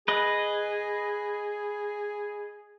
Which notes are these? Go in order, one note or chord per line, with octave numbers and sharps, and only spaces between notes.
G#4 B4 D#5